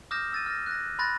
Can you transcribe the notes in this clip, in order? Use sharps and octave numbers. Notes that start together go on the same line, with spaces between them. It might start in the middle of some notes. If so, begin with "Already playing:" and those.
D6 D#6 F6 G6 A#6 E7
E6 A6 D#7
F6 A6 A#6
F#6 A#6
B5 C6 F#6 A6 A#6